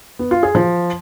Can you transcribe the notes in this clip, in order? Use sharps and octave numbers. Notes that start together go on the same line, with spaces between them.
B3
F4
G#4
F3